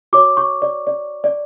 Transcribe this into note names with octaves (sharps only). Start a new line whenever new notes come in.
F#4 C#5 D6
C#6
D5
D5
D5